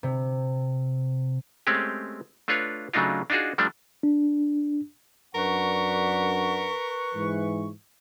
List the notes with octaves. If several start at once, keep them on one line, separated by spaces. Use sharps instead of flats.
C3
G#3 A3 C4 C#4 G4
A3 D4 F4 B4 C#5 F5
C#3 F#3 A3 D4 D#4 F4
D4 D#4 F4 F#4 G#4
F3 G3 A3 D4
D4
F#2 D4 A#4 B4 F#5 C#6
G#2 E3